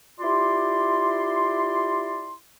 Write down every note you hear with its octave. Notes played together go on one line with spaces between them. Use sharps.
E4 F4 G4 D5 C6